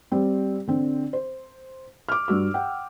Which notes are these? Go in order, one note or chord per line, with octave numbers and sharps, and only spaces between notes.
G3 C4
D3 C4
C5
D6 F6
G2 F#4 E6
F#5 G5